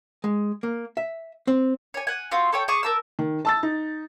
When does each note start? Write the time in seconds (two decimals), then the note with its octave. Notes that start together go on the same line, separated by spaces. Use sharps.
0.24 G#3
0.63 A#3
0.97 E5
1.47 C4
1.94 C#5 G#5
2.07 F#5 G#5
2.31 C4 F4 F#4
2.52 A4 C#5 G5
2.68 G#4 A5 C#6 D#6
2.83 A#4 A5 E6
3.19 D#3
3.45 A5 E6 A6
3.63 D#4